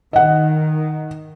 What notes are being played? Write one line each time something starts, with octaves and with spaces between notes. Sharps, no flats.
D#3 D#5 F#5